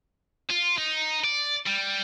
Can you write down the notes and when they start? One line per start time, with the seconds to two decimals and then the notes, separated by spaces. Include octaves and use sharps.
0.50 F4
0.78 D#4
1.24 D5
1.67 G3